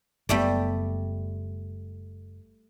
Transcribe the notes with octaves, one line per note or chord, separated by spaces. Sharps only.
F#1 G3 A3 B3 D5